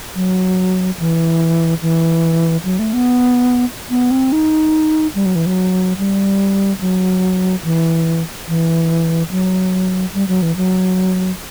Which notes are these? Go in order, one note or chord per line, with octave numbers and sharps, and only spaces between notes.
F#3
E3
E3
F#3
A3
B3
B3
C4
D#4
G3
F#3
E3
F#3
G3
F#3
E3
E3
F#3
G3
F#3
E3
F#3